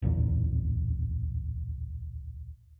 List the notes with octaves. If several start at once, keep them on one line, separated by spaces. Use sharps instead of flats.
D1 A#1 E2